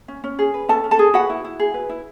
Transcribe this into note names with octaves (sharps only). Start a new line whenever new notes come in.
C#4
C#4
G#4
B4
C#4 A4 A5
C#4
A4 A5
G#4
F#4 B4 F#5
E4
E4
G#4
B4
E4